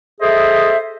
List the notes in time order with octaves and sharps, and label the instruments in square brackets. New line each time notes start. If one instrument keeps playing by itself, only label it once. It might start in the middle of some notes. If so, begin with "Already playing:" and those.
[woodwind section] G#4 A4 C5 D#5 E5